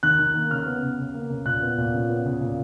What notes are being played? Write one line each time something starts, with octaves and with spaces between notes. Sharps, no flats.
D#3 F#6
D#3
A#3
C#3 F6
B3
C#3
C#3
A#3
C#3
A#2 F#6
B3
A#2
C#3
B3
C#3
A#2